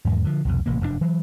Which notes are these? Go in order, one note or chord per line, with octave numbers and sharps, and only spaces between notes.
E2 G#2 D#3
D3 F3
C2 F2 B2
A1 C3 A#3
F1 F#2 A#2 D4
E3 F#3